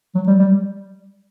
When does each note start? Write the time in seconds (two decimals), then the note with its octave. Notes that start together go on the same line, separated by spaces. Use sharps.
0.15 F#3
0.27 G3
0.39 G3